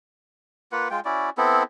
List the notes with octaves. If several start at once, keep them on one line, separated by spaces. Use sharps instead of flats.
A#3 F4 B4 F#5
G#3 F4 G5
C#4 E4 F#4 D5
B3 C4 E4 A4